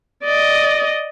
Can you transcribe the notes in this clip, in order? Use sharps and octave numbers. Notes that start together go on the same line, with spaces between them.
D5 D#5